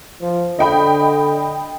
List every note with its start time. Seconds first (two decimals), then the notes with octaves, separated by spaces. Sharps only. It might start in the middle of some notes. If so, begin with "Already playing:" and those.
0.21 F3
0.59 D3 D#5 G5 B5